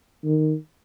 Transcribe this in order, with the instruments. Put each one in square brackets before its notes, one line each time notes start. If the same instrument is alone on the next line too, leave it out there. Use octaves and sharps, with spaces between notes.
[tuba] D#3